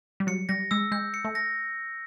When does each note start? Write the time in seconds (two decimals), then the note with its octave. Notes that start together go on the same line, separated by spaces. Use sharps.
0.20 G3
0.27 F#3 C#7
0.49 G3 A#6
0.71 G#3 E6
0.92 G#3 G6
1.14 C#7
1.25 A3
1.35 A#6